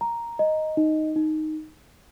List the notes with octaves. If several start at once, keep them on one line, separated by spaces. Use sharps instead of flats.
A#5
D#5
D#4
D#4